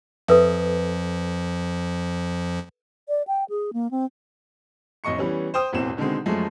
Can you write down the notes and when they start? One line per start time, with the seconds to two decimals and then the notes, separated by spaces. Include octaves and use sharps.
0.28 F2 F3 A4 B4 E5
3.09 D5
3.27 G5
3.49 G#4
3.73 A#3
3.91 C4
5.04 A1 F2 D#5 C#6 C#7
5.18 E3 G3 B3 C#4
5.54 C5 G5 D#6
5.73 E1 A1 E2 C4 E7
5.97 B2 D3 D#3 G#3 C4
6.26 F#2 F3 G#3 A3